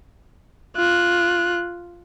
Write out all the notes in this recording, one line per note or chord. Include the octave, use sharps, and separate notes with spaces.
F4 F#6